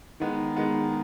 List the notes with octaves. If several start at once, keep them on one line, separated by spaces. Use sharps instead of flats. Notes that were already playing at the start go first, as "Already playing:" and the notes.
D#3 G#3 B3
D#3 G#3 B3